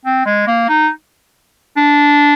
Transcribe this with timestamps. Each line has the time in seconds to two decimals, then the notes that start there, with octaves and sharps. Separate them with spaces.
0.05 C4
0.25 G#3
0.47 A#3
0.69 D#4
1.77 D4